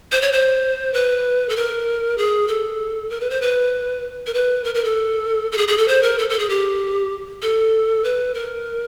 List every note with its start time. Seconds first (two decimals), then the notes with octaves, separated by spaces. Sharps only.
0.12 C5
0.22 C#5
0.32 C5
0.94 B4
1.49 A4
1.57 A#4
2.18 G#4
2.48 A4
3.10 A#4
3.21 B4
3.30 C5
3.42 B4
4.27 A#4
4.34 B4
4.64 A#4
4.75 A#4
4.84 A4
5.52 A4
5.58 G#4
5.68 G#4
5.78 A4
5.88 C5
6.03 A#4
6.19 A4
6.30 A4
6.39 G#4
6.49 G4
7.42 A4
8.04 B4
8.34 A#4